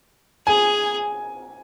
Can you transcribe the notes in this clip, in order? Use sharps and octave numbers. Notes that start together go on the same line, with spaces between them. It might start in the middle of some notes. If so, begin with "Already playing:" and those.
G#4 G#5